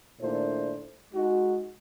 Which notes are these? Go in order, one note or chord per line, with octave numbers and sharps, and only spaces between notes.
A#2 D#3 A3 D4 E4 C5
G#3 D#4 F#4